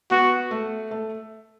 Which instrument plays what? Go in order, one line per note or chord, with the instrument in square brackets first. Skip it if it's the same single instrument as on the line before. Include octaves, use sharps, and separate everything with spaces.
[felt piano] B3 [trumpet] F#4
[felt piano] A3
A3